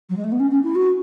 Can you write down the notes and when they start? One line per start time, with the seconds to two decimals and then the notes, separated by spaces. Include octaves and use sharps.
0.10 F#3
0.17 G#3
0.24 A3
0.32 B3
0.40 C#4
0.51 C#4
0.64 E4
0.75 F#4